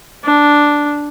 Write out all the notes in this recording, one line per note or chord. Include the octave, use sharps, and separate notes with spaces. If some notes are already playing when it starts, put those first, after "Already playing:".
D4